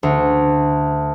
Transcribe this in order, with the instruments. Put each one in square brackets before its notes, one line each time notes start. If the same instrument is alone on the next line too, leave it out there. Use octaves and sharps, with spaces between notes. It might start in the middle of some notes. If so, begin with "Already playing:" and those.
[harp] D2